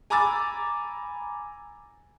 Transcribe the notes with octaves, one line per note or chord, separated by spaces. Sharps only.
G#5 A#5 B5 D6 E6 A6